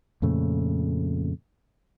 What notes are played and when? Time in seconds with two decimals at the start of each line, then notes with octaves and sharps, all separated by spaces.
0.22 F2 A#2 C#3 A3